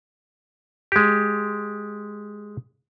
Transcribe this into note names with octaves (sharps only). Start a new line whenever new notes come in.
G#3 G4